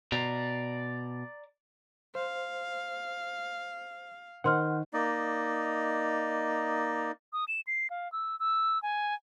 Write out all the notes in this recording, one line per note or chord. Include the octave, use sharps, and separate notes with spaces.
B2 D5 A#5
C5 F5
D#3 A#4 C5 F#5 C6 F6
A#3 D#4 D5 D#5
D#6
E7
C7
F5
E6
E6
G#5